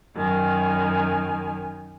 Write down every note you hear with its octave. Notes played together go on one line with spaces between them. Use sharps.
F#2 D#3 G#5